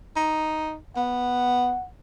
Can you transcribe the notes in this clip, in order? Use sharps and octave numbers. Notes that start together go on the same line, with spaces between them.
D#4
B3 F#5